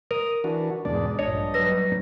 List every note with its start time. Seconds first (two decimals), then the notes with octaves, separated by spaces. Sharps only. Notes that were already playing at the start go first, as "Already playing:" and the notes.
0.11 A#4 D#6
0.44 E3 D4 F#4
0.85 E2 G#2 B2 G#3 D4 D5
1.19 A#1 G2 D4 C#5 D#5
1.54 F#3 G3 B4 A#6